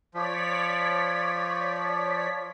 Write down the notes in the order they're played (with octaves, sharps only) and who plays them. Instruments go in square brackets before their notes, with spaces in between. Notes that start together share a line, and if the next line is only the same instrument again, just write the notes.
[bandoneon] F3 [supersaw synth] C#5 D5 B6